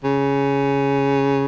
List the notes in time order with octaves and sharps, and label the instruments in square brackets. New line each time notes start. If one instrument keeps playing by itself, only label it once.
[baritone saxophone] C#3